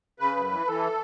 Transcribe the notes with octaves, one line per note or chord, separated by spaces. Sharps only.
C#3 B4
F#2
E3
E3 A4